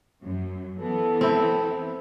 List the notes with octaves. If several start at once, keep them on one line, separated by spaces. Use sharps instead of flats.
F#2
E3 B3 A4
C4 E4